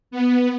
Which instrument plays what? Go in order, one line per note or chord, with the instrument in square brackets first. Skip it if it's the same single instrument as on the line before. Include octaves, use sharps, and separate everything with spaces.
[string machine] B3